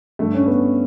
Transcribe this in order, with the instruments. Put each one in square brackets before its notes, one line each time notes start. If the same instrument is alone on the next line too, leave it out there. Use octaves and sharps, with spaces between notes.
[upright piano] G2 D3 A3
C#4
B3